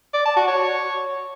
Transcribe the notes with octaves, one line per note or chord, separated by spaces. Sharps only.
D5
A5
F#4
C#5